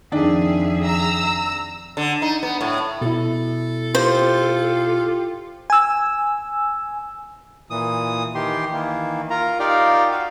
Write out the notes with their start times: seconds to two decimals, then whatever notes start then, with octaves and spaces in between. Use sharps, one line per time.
0.12 F2 D#3 D4 G#4 E5
0.84 A#5 E6
1.97 D3
2.22 D#4
2.43 B3
2.61 A2
3.01 B2 E4 A4
3.95 F4 G4 C5
5.70 G#5 E6
7.70 A#2 E3 D#6
8.35 D#3 E3 G4 C6
8.72 D#3 E3 A#3
9.30 F4 A#4 A#5
9.59 D#4 F4 G4 A#4 D5 F5
10.11 F#4 F5